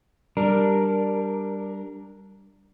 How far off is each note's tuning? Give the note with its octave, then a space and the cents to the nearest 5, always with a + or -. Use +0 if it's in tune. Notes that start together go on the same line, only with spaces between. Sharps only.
G3 +0 D4 +0 A#4 +0